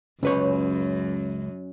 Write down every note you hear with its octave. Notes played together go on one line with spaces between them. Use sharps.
C#2 F#2 C#4 B4 C#5